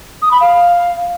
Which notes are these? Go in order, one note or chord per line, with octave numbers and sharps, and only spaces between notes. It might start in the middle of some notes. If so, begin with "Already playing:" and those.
D#6
B5
F5